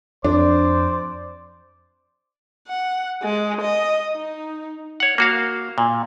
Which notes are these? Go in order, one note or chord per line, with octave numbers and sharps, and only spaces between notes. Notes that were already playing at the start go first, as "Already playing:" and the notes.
F2 D4 C5 D5
F#5
G#3
D#5
D#4
C#5 F#5
A#3 F#4 F5
A#2